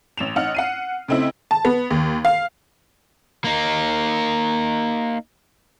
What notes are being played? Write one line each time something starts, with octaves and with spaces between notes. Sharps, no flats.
A1 E7 F7
A1 D#4 F#5 F6
F#5 C7 D#7
C#3 A3 C4 D#4 E4
A5
B3
D#2
F5
A#3 D#4